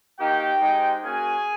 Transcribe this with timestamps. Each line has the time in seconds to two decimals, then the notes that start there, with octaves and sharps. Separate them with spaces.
0.18 A#3 D#4 F#4 G4 G5
0.61 G#3 C4 D#4 G4
1.02 A#3 C#4 F#4 G#4 G#5